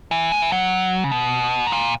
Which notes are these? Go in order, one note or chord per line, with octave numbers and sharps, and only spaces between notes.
E3
G#3
E3
F#3
C#3
B2
G#2
A#2